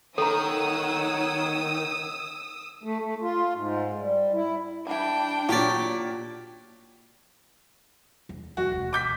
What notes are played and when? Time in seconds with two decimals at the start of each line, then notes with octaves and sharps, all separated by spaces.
0.18 D#3 A4 C#5 F#5 A#5 D#6 E6
2.84 A3
3.01 A3
3.22 F4
3.55 G#2
4.01 G3
4.33 E4
4.87 E3 G3 D4 G5
5.49 A#2 F#3 F#4 G4 D5
8.29 E2
8.57 D#2 E3 F#4
8.72 E1 D2
8.93 D6 G6 B6